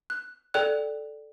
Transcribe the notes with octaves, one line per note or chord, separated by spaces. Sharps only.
F#6
A4 D5 G5 F#6